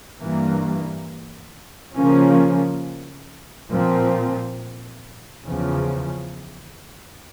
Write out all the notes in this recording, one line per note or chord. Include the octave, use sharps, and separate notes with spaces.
G2 E3 A#3
C#3 F3 A#3 C#4
A#2 F3 C4
E2 C#3 F3